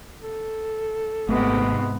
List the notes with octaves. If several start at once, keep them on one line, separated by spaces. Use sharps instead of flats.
A4
G#1 G#2 C3 A3 B3